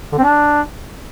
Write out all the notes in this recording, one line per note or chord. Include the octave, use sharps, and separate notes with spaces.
D3
C4
D4